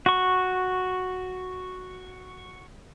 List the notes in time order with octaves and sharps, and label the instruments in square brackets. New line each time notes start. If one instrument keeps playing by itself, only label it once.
[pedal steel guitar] F#4 C#6